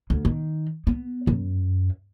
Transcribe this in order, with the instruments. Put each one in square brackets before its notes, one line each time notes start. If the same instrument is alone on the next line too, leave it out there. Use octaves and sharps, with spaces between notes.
[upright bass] D2
D#3
B3
F#2